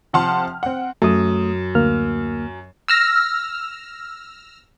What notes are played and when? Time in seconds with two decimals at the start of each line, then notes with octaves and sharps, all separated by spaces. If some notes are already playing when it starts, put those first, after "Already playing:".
0.13 C3 F3 F#5 A5 C6 F6
0.63 C4 F#5
1.02 F#2 A3 D#6
1.75 D2 A#3 F6
2.88 E6 F6 A#6